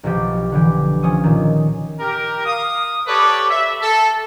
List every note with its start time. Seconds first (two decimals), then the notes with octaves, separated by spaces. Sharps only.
0.04 B1 B2 F3 G4
0.52 D3 E3 G4
1.03 F3 C#4 G#5 D#6 D#7
1.24 A#2 D#3
2.00 G4 A#4
2.45 F5 D#6
3.07 G4 A4 B4 C#5 D5
3.50 E5
3.82 A4